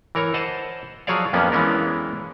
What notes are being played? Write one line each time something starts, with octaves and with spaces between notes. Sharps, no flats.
E3 A#4 C#5 A#5
C5 D#5 F#5 A5
F3 F#3 G#4 C#5 D5 F5
F2 A#2 A#3 B3 C#4
E3 G#3 B3 C#4 D4 A#4